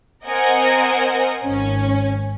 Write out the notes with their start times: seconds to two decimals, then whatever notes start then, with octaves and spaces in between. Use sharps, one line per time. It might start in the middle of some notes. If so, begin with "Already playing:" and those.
0.26 C4 A#4 C5 D#5 F#5 G#5
1.44 G#1 C#4